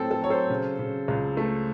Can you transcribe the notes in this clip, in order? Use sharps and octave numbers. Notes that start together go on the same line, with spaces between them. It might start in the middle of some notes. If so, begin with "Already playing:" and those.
Already playing: A2 F#3 C4 A4
A4
F#3 C#5
A4 C5
C#3
C#3
C#2
A3